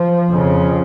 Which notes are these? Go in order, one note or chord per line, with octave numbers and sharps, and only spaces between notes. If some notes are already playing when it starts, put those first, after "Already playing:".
Already playing: F3
F2 C#3